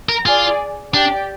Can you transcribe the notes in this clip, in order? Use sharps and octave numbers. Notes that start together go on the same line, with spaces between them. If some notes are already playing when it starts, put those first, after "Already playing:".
A#4
F4 G#4 D5 G#5
D4 G4 D5 G5